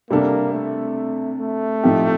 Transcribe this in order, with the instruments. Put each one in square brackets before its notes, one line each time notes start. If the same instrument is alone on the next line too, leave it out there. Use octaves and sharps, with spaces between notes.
[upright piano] C3 G3 D4 A4 [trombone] A#3
[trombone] A3
A3
[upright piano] A2 F3 C4 D#4 G4